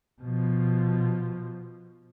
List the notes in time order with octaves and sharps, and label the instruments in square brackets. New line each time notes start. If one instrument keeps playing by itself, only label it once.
[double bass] B2 F3